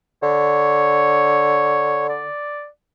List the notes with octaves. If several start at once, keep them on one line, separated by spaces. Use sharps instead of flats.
D3 C#5
D5